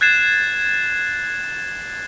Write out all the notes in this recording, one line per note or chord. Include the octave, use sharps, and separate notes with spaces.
F#6 G#6 A6 C7 E7